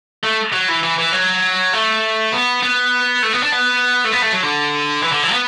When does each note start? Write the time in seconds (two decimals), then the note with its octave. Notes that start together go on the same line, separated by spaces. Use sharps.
0.23 A3
0.52 F#3
0.68 E3
0.83 E3
0.98 E3
1.12 F#3
1.73 A3
2.33 B3
2.63 B3
3.23 A3
3.33 B3
3.43 D4
3.52 B3
4.04 A3
4.12 B3
4.22 A3
4.33 F#3
4.43 D3
5.03 E3
5.12 D3
5.23 E3
5.32 B3